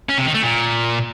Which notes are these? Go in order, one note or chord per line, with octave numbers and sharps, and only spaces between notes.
C#4
C3
D#3
A3
A#2